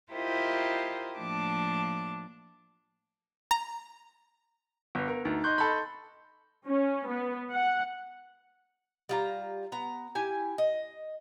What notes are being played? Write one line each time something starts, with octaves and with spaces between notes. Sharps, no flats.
E4 F4 G4 A#4 C5 D#5
A2 F3 A#3 D4 A5 D6
A#5
G1 B3 B4
A#4
D2 D#4
D#5 C6 C#6 F#6 G6
D#4 A4 B5
C#4
B3
F#5
G3 F4 A#5
B3 A#5
E4 G4 G#5
D#5